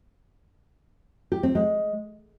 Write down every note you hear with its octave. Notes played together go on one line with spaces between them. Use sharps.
G4
C4
G#3